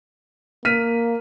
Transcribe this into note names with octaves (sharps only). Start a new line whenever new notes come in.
A#3 F6 B6 D#7